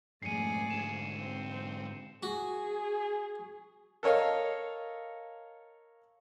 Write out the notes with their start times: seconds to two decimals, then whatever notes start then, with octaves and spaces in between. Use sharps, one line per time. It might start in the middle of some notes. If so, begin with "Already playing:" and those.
0.22 F2 G#2 A3 G#4 D5 C7 C#7 D#7
0.70 G#2 D3 E7
1.17 C4
2.23 F#4 G#4
4.03 A4 A#4 C#5 D#5 F5